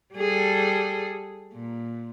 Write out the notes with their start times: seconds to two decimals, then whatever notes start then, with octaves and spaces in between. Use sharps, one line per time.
0.15 G3 G#4 A4
1.53 A#2